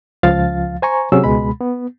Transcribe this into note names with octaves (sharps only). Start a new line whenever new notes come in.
C#2 F3 F5 A6
C5 G#5 A#5 C#6
C3 F#3 C#4 G#4 E6
C#2 B2 G#3 B5
B3